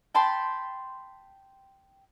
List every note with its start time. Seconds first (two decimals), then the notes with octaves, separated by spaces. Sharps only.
0.14 G5 A5 B5 C6